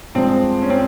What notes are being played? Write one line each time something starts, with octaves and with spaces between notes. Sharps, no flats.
G2 F3 G#3 C4
C#4
C4